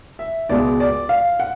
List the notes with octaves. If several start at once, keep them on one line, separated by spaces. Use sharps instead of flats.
E5
C#2 B2 G#3 D5
D5
F5
F#5